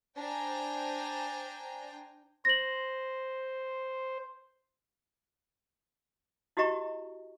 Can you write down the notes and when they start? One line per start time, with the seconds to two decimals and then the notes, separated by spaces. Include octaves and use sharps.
0.18 D4 C5 G5 G#5 A#5
2.45 C5 A#6 F#7
6.57 E4 F#4 G4 D#5 A#5 C#6